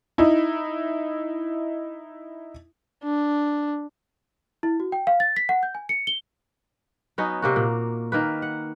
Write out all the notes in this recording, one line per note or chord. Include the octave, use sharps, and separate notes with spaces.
D#4 E4
D4
E4
F#4
G5
F5
A6
B6
F#5
G6
G#5
C#7
G7
F#3 B3 C#4 D#4
C3 A#3 F#4
A#2
D#3 A#3 B4
F#5